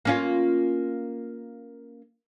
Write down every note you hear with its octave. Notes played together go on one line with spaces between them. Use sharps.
A#3 C#4 F4